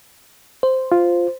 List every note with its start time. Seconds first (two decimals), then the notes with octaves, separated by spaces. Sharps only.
0.63 C5
0.92 F4